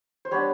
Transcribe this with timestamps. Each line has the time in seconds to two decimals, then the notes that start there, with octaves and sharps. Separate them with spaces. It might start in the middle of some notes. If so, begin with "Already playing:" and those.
0.25 C5
0.31 G3 B3 D4 B4 C#5